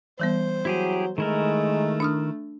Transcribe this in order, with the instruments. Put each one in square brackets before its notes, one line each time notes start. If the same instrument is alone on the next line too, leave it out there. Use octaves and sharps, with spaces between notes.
[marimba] E3 G3 B3 [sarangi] C5
[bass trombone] F#3 [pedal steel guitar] E4 G4 G#4
[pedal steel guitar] D#3 E4 A#4 [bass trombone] G#3 [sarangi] A3
[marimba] D4 D#6 F6